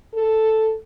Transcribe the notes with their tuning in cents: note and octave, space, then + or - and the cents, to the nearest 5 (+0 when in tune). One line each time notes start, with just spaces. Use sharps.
A4 +0